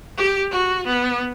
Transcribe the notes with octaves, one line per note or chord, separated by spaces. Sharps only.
G4
F#4
B3